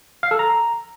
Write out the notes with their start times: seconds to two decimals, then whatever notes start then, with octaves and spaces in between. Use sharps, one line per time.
0.23 F5
0.31 A4
0.39 A#5